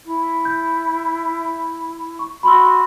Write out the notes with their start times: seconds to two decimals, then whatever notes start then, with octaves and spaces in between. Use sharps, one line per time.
0.05 E4
0.45 G6
2.19 C#6
2.43 F#4 B5 C6 E6